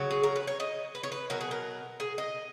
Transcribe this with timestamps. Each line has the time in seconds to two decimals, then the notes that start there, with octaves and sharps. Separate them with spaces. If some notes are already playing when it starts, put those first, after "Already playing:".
Already playing: C#3 F#3 C#5
0.11 G#4
0.23 A#4
0.36 B4
0.47 C#5
0.60 D#5
0.95 B4
1.03 C#5
1.12 B4
1.30 B2 F#3 A#4
1.41 G#4
1.51 A#4
2.00 G#4
2.18 D#5